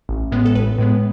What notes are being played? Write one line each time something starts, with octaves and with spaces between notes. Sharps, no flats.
A1
A2 G#3 B3
A4
A1 B4
A2 G#3 B3